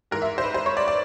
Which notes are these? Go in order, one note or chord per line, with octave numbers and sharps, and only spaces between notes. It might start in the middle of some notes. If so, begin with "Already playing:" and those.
G#2 E3 A#4
E5
C5
B4
C5
C#5
D5
D5